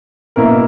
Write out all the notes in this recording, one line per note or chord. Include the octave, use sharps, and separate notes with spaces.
B2 A#3 E4 A#4